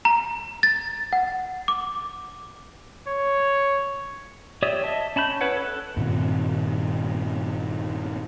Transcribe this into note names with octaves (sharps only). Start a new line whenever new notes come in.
A#5
A6
F#5
D6
C#5
G4 C#5 D5 E5 D#6
D#5 E5 A5
C#4 A5 B5 G6
E4 B4 C#5 F#5
A4 F#6
G2 A#2 D#3 C4